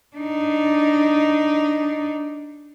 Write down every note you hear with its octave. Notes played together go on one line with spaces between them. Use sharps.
D4 D#4